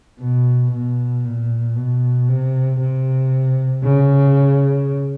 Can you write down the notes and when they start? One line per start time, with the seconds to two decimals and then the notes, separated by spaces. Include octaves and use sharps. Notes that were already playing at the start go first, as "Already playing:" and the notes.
0.20 B2
0.72 B2
1.24 A#2
1.76 B2
2.29 C3
2.80 C3
3.84 C#3